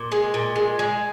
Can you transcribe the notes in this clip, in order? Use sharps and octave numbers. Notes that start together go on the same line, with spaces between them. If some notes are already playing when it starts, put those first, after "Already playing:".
Already playing: A#2
G#3
A#2
G#3
G#3